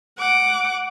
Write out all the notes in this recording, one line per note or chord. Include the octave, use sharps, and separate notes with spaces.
F#5 D6